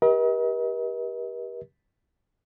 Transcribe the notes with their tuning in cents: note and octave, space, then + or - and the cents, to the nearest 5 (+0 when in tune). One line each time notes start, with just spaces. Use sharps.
G4 +0 A#4 +45 D#5 +40